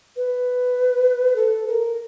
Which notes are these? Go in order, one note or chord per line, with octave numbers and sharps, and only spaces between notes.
B4
A4
B4
A#4